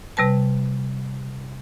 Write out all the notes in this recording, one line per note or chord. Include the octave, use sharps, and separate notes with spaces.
C3 G3 B4 A5